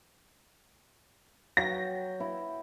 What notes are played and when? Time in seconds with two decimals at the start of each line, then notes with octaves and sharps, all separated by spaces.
1.57 F#3 G5 A#6
2.20 E4